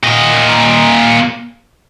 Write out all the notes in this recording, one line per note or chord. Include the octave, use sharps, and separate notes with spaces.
A#2 D#5